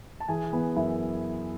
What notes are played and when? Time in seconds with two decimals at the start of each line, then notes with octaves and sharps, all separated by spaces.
0.20 A5
0.29 E3 G#4 G#5
0.53 E3 B3 B4
0.76 F#2 E4 E5